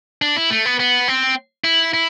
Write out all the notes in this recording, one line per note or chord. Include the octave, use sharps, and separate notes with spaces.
D4
E4
A3
B3
B3
C4
E4
E4